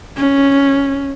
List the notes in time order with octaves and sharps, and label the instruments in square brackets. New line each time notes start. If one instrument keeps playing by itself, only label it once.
[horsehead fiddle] C#4